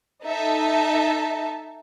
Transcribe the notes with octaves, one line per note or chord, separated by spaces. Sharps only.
D#4 A4 E5 A5